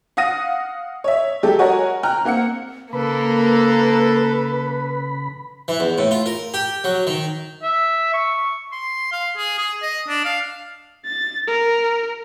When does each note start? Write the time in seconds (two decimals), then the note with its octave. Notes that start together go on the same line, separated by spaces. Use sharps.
0.17 F5 F#5 D#6 A#6 D#7
1.04 C#5 E5
1.43 F#3 G#3 G4 A4
1.59 F#4 A#4 C#5 D#5 F#5 G#5
2.03 G5 A#5 F6 F#6
2.25 A#3 C4 F#5 C#7
2.93 C#3 A#3 A4 B4 B5
5.68 E3
5.80 E2
5.98 A2
6.11 F4
6.26 A#4
6.54 G4
6.84 F#3
7.07 D#3
7.63 E5
8.14 C#6
8.72 C6
9.12 F5
9.37 G#4
9.58 G#4
9.82 D#5
10.08 D4
10.25 F5
11.05 A6
11.48 A#4